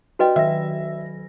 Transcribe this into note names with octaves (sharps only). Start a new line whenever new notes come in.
D4 F#4 G4 B4 D#5 G5
D#3 F#3 E5 A#6